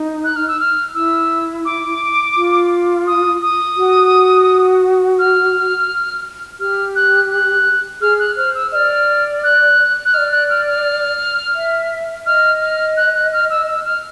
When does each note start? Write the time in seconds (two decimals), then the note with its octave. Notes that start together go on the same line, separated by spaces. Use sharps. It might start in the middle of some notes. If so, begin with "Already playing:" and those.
Already playing: D#4
0.24 F#6
0.36 F6
0.48 E6
0.60 F6
0.94 E4 E6
1.65 D6
2.36 F4
3.07 D#6
3.42 D#6
3.77 F#4
5.19 F6
6.60 G4 F6
6.96 F#6
7.31 F#6
8.01 G#4 F6
8.19 F#6
8.37 C5 F6
8.55 E6
8.72 D5 D#5 F6
9.44 F#6
10.05 F#6
10.14 D5 D#5 F6
10.32 F#6
10.49 F6
10.67 F6
11.55 E5
12.26 D#5 F6
12.62 F6
12.97 F#6
13.15 F#6
13.32 F6
13.50 E6
13.68 E6
13.85 F6